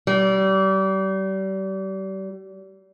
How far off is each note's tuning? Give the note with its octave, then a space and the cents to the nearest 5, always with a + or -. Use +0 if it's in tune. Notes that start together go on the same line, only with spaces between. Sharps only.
G3 -35